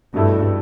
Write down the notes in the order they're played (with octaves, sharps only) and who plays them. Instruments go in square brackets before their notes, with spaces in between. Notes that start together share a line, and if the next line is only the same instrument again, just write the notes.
[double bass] G2 [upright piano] B2 A3 E4 A4